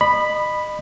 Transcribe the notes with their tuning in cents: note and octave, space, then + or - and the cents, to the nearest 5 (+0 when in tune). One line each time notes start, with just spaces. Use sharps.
D#5 -30 B5 +0